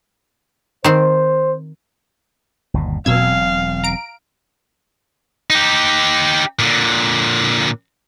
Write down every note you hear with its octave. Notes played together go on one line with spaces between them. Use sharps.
D#3 C4 C5
G1 D#2 B2
E1 B2 F#3 C4 F5 E6 G#6
A#5 D7
D#4 G4
A#2 D3